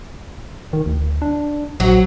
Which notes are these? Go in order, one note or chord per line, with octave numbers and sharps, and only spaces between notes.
D#3
D2
D4
A#1 F#3